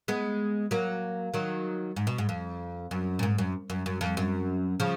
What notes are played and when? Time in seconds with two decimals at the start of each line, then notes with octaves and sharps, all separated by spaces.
0.08 G#3 B3
0.71 F#3 A#3
1.34 D#3 F#3
1.96 G#2
2.07 B2
2.18 G#2
2.29 F2
2.91 F#2
3.19 A#2
3.23 G#2
3.38 F#2
3.70 F#2
3.86 F#2
4.01 F2
4.17 F#2
4.80 C#3 F3